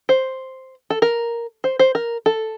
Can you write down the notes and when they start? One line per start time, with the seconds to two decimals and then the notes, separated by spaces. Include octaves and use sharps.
0.09 C5
0.90 A4
1.02 A#4
1.64 C5
1.79 C5
1.95 A#4
2.26 A4